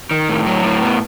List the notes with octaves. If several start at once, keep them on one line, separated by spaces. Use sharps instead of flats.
D#3
A2
F#3
A2
B3